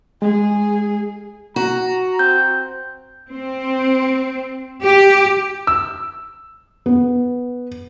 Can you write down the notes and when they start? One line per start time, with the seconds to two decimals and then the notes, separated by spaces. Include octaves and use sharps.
0.22 G#3 G#4
1.56 F#4 A#5
2.19 C4 G6
3.31 C4
4.84 G4
5.67 E6
6.86 B3